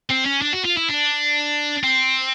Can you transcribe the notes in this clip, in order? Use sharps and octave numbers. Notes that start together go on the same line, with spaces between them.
C4
C#4
D4
F#4
F4
E4
D4
C4